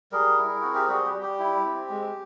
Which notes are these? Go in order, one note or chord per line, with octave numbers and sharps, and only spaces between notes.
G3 G#4 A#4
E4
C4 F#4
G4
G3 F#4 G#4
G4
G3
G4
E4
C4
G#3